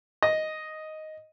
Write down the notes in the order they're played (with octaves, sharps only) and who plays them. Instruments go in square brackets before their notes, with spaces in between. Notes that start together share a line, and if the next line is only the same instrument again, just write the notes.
[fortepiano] D#5